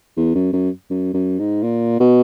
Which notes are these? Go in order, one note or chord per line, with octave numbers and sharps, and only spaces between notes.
E2
F#2
F#2
F#2
F#2
G#2
A#2
B2